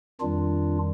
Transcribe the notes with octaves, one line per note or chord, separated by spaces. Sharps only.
F2 D#3 G3 D4 F4